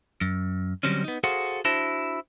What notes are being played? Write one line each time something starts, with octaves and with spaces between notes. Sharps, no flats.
F#2
D3 F#3 G3 C4 C#4
B3 D#4
F#4 G#4 A4 C5 F5 F#5
D4 E4 F#4 C5 A5